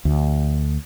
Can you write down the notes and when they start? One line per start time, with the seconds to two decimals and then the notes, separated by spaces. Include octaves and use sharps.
0.05 D2